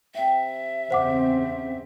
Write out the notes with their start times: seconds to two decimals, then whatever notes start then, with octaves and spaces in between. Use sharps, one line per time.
0.15 C3 E5 G5
0.90 E2 C#3 C4 C5 F#5 D6